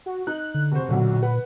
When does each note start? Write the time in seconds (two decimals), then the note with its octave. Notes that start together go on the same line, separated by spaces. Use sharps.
0.06 F#4
0.27 D#4 F#6
0.54 D3
0.72 F1 F#4 C5
0.89 B1 F#2 A#2 D3
1.23 B4 F#5